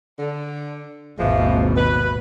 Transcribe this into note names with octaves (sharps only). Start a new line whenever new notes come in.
D3
G#1 D#2 B2 E3 F3 G#3
B4